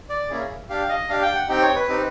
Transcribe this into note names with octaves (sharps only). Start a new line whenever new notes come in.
D5
A#3 C#4 E4 G#4
D4 G4 F5
D#5
D4 G4 F5
G5
F#5
C4 D#4 G4 G5
C#5
B4
C4 D#4 G4